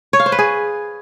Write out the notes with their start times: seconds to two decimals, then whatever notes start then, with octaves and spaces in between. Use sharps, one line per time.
0.13 C#5
0.20 F5
0.26 C5
0.32 B4
0.39 G#4